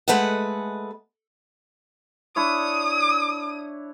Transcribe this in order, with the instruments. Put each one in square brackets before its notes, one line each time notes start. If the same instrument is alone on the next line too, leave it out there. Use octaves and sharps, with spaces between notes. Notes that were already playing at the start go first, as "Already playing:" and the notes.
[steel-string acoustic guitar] G#3 A3 B4 D#5 F#5
[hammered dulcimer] D4 E4 C#5 [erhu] D#6